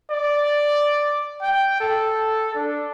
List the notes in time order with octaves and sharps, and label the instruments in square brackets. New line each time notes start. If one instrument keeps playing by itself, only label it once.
[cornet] D5
G5
A4
D4